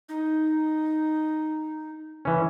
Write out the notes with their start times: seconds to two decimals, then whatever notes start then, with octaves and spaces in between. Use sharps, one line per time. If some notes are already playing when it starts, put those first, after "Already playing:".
0.09 D#4
2.25 E3 C#4